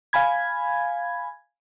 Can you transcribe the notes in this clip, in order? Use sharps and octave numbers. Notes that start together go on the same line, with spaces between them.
F5 G#5 B5 G#6